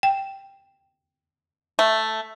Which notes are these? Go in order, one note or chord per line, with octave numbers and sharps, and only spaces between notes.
G5
A3